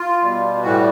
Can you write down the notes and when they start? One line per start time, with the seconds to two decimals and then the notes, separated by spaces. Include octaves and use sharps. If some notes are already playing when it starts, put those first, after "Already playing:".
Already playing: F4
0.22 B2 G3
0.62 A2 E3 G3 F#4